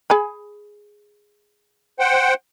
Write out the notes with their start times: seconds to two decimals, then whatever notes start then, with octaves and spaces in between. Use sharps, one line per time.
0.10 G#4 G#5 B5
2.00 C5 F#5 G5